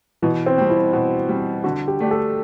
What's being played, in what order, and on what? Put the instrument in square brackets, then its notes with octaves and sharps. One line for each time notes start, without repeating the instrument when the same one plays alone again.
[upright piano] B2 [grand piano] E3
[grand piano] C4
[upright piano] G3 C4
[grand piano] E4
[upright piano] B2 [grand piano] F#4
[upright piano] G3 C4
[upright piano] D3 [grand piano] F#4
[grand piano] G4
[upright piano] A3 D4 G4
[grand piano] A4